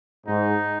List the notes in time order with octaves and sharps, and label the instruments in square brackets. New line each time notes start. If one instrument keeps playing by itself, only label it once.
[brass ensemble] G#2 [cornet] D#4